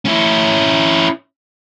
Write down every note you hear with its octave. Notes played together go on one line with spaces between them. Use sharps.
C#4 E4